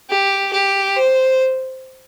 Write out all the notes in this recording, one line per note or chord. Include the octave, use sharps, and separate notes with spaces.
G4
G4
C5